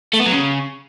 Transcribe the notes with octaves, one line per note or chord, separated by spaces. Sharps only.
A3
B3
F#3
C#3